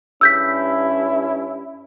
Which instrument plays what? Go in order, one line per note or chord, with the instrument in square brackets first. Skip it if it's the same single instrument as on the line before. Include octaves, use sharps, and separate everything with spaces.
[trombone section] G2 C#4 E4 [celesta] E6 G6 B6